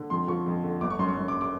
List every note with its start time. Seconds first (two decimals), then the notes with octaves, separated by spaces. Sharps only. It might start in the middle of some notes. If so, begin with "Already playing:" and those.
Already playing: D3
0.10 F2 C6
0.28 F3 C#6
0.46 F2
0.63 D3
0.81 G1 D6
0.90 C#6
0.99 F#2 C6
1.08 C#6
1.17 F#2
1.28 D6
1.41 D6